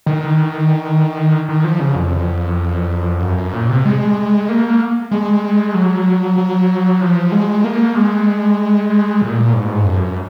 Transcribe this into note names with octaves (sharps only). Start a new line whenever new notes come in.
D#3
D#3
F3
C#3
F2
F#2
F#2
A#2
C3
G#3
A#3
G#3
F#3
F#3
F3
G#3
A#3
G#3
G#3
A#2
G#2
F#2